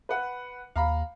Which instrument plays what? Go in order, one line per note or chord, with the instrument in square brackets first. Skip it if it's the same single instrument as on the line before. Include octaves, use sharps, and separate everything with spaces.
[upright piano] B4 F#5
[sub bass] D#2 [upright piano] F5 A#5 B5